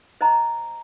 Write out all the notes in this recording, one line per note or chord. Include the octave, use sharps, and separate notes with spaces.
C5 D#5 A#5